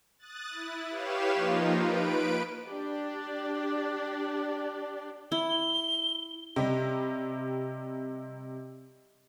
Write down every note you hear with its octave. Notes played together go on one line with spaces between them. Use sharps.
D#6 F#6 A6
E4
G4 B4 C#5 F5 E7
F3 A#3 D#4 F4
B4 D7
D4 G4 D5
E4 G7
C3 G3 D#5